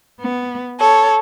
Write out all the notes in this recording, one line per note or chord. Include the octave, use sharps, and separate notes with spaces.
B3
A4 C#5